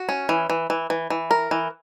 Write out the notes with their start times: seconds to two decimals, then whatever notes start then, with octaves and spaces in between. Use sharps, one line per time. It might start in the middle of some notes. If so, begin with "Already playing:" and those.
Already playing: F#4
0.09 C#4
0.29 E3
0.50 E3
0.70 E3
0.90 E3
1.10 E3
1.31 A#4
1.51 E3